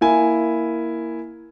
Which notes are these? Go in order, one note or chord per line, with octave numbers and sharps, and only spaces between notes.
A#3 E4 G#5